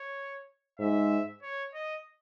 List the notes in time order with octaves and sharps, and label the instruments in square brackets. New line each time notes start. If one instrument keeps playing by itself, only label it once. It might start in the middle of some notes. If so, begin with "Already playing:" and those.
Already playing: [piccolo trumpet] C#5
[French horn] G#2 [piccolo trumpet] E5
[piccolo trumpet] C#5
D#5